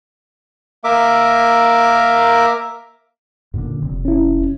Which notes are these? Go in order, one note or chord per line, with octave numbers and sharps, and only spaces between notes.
A#3 A#4 E5 D6
F#2 A#2 D3
F1 C3
C#4 E4